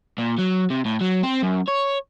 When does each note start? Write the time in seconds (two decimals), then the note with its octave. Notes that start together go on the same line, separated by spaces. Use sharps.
0.18 A#2
0.39 F#3
0.70 C3
0.85 A2
1.01 F#3
1.23 C4
1.42 F#2
1.68 C#5